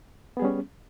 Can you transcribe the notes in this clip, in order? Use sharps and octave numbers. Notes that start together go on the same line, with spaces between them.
G3 B3 C#4 G#4